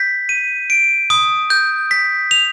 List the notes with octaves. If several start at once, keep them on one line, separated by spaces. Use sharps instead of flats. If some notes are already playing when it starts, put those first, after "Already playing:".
Already playing: G6 B6
D#7
D7
D#6
G6
B6
F7